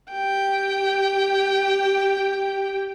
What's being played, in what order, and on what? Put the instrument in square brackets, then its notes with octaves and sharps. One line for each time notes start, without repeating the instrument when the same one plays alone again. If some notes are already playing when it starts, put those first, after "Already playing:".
[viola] G4 G5